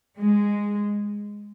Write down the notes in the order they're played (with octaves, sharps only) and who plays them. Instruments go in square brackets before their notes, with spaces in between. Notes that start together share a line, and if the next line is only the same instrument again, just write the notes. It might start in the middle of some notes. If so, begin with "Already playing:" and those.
[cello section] G#3